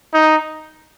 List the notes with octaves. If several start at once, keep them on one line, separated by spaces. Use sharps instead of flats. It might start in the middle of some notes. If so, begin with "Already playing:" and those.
D#4